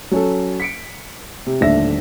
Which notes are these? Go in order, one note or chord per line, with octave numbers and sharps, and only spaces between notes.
F#3 C#4 A4
B6 C#7 D7
C3
D#1 A2 D3 D4 E5 A#6